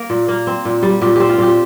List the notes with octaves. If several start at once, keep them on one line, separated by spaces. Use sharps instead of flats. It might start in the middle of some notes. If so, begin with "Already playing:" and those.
Already playing: A#3 A#4
A#2
A#3
C4
A#2
G3
A#2 G4
C4 G4
F4
A#2 G4